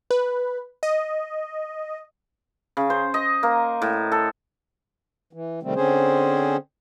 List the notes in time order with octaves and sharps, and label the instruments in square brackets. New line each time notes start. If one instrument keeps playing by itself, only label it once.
[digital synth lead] B4
D#5
[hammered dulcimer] C#3
C5
D#5
A#3
A2
A4
[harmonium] E3
C3 D#3 G3 A3 C4
D3 C4 C#4 G#4 C5